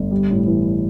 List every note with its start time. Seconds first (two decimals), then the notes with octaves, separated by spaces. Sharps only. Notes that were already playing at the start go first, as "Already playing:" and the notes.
Already playing: G1
0.11 G3
0.30 A2
0.47 E3